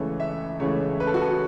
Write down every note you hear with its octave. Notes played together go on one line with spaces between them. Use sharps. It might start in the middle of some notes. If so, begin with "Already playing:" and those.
Already playing: C#2 C#3 E3 A3 C#5
E5
C#2 C#3 E3 A3 C#5
B4
A4
F#4
A4